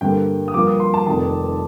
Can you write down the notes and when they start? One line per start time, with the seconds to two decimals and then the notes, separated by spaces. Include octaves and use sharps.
0.01 G2 D3 G3 A#3 G5
0.48 D#6
0.54 G2 F3 A#3 F4 D6
0.67 D#6
0.80 C6
0.94 A5
1.07 F1 F2 D#3 A5